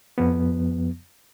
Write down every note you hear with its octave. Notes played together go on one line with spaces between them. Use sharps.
F2 F3 B3